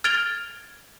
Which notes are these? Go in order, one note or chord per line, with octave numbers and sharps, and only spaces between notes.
F6 G#6 A6 D7 F7 G7